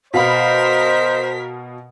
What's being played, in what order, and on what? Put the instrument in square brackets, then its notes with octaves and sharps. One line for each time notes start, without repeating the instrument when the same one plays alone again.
[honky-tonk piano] B2 F5 B5 [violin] A#4 B6 [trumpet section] C5 [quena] D#5